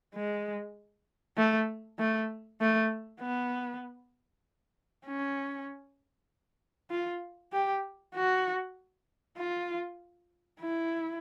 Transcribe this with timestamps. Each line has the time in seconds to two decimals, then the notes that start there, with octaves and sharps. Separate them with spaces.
0.14 G#3
1.38 A3
1.99 A3
2.60 A3
3.21 B3
5.07 C#4
6.91 F4
7.52 G4
8.14 F#4
9.37 F4
10.61 E4